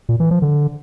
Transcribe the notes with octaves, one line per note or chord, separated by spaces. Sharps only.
A#2
E3
F3
D3